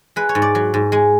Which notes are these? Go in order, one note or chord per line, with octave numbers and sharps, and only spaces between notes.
G#3 B4
C#5
G#2
D5
F#3
G#2
G#3